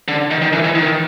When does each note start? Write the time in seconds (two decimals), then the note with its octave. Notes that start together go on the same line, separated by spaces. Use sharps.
0.08 D3
0.31 D#3
0.42 D#3
0.53 E3
0.64 E3
0.75 D#3